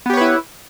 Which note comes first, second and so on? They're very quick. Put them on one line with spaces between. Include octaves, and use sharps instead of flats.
B3 G4 C#5 B4 E4